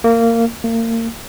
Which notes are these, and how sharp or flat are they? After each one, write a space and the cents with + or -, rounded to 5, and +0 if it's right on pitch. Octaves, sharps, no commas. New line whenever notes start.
A#3 -20
A#3 -35